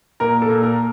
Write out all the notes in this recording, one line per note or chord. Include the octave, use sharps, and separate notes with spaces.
A#2 A#4
A4
A#2
A#4